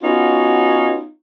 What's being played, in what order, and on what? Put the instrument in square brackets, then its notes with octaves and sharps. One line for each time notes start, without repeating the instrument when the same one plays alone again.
[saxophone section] B3 C#4 D#4 F4 F#4